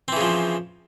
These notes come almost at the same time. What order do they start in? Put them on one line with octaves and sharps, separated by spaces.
C4 E3 C#3 F3